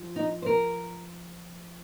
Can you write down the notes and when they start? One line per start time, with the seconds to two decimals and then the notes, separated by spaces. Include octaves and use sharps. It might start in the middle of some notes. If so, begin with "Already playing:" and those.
Already playing: F3
0.16 D#4
0.42 C5
0.46 A#4